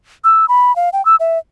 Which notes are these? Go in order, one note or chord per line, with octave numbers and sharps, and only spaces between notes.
E6
B5
F5
G5
E6
E5